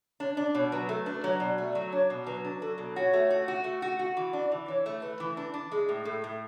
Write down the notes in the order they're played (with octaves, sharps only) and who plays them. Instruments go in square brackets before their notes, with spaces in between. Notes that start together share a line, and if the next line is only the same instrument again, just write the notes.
[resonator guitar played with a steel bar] D4 [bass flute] C#5
[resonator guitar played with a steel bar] D4 [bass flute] D5
[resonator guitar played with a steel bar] B2 [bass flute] C#5
[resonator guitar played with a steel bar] F#3 [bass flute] B4
[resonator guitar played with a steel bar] A3 [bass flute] A4
[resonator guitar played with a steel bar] D4 [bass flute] B4
[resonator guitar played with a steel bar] F#3 [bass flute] C#5
[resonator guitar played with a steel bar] B2 [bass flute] D5
[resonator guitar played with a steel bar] A3 [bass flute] D5
[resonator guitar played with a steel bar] F#3
[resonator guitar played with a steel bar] D4 [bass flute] C#5
[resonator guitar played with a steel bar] B2
[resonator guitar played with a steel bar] F#3 [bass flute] B4
[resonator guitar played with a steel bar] D4
[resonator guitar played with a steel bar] F#3 [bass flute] A4
[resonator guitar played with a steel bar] B2
[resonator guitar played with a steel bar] F#4 [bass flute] C#5
[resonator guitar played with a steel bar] A3
F#4
F#4
A3
F#4
F#4
E3
[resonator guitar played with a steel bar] D4 [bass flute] D5
[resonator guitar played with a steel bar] E3
[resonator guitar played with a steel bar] E3 [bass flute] C#5
[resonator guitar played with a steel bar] A3
[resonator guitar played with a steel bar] A3 [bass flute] B4
[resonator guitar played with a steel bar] E3
D4
D4
[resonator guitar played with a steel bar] G#3 [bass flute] G#4
[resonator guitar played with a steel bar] A2
[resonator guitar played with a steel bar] A2 [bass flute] A4
[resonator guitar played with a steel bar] A2